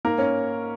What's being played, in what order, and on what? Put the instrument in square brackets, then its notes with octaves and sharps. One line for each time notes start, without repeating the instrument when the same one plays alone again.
[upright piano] G#2 A#3 A#4
C#4 C#5